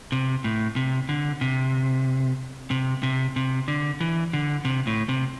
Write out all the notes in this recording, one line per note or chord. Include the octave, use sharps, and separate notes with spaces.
C3
A2
C3
D3
C3
C3
C3
C3
D3
E3
D3
C3
A2
C3